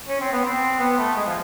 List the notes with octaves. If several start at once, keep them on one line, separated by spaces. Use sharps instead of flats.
C#4
C4
B3
C4
B3
A3
G#3
F3